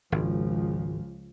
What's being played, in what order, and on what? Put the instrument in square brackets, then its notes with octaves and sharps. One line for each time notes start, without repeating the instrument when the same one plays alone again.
[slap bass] G#1 [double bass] C#2 F3